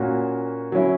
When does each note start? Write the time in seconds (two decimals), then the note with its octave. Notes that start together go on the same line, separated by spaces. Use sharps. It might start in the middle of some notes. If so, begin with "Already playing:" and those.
Already playing: A#2 A#3 C#4 F#4
0.72 F#3 C#4 E4